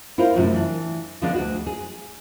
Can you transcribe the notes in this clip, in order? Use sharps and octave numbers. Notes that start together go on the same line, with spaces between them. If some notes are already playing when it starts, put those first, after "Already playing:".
E4 F4 A#4 C5
F#2 A2 C3 F#3 C#4
E3 D4
D3 F3 G#3 A#3 B3 D4
D2 D4 F#4
G#4